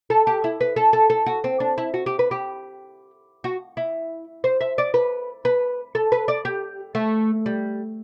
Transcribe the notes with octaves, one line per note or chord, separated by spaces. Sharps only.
A4
G4
E4
B4
A4
A4
A4
F#4
C4
D4
E4
F#4
G4
B4
G4
F#4
E4
C5
E5
D5
B4
B4
A4
B4
D5
G4
A3
G3